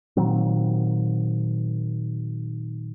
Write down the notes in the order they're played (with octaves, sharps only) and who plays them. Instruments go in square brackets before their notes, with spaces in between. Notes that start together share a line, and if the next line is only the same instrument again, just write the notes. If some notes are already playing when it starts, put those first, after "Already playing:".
[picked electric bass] A#2 D#3 F#3 C4